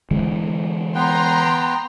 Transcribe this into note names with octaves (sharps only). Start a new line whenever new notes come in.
D3 E3 G#3
B3 B4 G5 A#5 C6